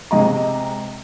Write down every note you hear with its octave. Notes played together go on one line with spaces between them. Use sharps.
C3 G#3 D#5 A#5